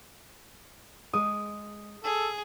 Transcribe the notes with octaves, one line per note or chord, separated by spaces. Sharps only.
G#3 D#6
G#4 A4